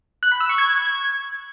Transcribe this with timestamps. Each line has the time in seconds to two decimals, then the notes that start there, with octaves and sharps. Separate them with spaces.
0.23 F#6
0.32 B5
0.40 E6
0.49 C#6
0.58 G#6